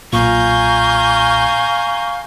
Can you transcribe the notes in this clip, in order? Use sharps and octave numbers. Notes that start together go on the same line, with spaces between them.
B1 A#2 F5 G#5 A#5 C#6 G6